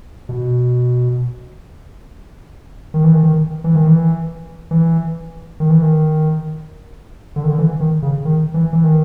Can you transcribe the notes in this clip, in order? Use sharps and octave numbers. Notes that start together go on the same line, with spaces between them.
B2
D#3
E3
D#3
D#3
E3
D#3
E3
E3
D#3
E3
D#3
D3
D#3
D3
E3
D#3
C#3
D#3
E3
E3
D#3